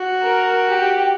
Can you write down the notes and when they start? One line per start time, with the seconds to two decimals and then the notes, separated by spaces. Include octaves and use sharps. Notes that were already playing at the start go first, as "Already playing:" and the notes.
Already playing: F#4
0.22 A#4
0.67 G4